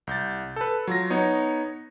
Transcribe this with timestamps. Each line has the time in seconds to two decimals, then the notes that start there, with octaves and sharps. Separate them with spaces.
0.07 C2 G6 A6
0.56 A4 B4
0.87 F#3 F4 A#6
1.10 B3 D#4 C#5